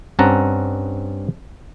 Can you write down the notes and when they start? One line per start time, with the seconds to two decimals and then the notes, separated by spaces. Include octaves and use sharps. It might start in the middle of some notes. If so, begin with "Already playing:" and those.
0.19 G2 C4 C#4 F#5 A5 A#5